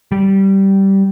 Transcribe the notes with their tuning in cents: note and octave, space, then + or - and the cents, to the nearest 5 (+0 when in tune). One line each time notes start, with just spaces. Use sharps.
G3 -15